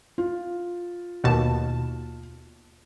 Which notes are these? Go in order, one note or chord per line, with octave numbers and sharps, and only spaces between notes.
F4
D#2 B2 A5